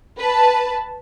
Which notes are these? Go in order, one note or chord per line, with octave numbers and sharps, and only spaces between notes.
B4 A5